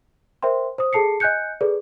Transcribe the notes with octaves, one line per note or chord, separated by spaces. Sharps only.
A#4 C5 E5 G5 C6
C5 D#6
G#4 A4 A5 C7 C#7
D#5 G#5 F#6 G6 C#7
G#4 A4 B4 D5